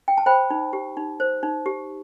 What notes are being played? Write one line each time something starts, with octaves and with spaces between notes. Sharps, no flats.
G5
A5
C5 G5 B5
D#4
G4
D#4
C5
D#4
G4